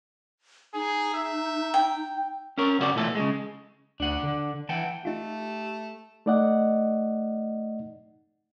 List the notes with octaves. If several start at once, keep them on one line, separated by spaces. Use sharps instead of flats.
D#4 G#4
E5
G5
C#4 A#4 C#5
F#2 C#3 E4 F#4 D5
B1 A#2 E3 A3 A4
C#3 G#3
D2 D4 F#5
D3
E3 F#5 G5 A5
A3 D#4 F4 G4
A3 D#4 D5 D#5 F#5